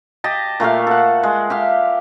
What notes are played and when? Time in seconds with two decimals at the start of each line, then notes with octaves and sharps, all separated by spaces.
0.24 G4 D#5 A5
0.60 A#2 A3 G4 F5
0.87 A4 F#5
1.23 G#3
1.50 G4 E5 F5